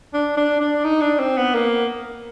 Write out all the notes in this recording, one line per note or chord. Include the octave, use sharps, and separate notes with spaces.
D4
D4
D4
D#4
D4
C4
B3
A#3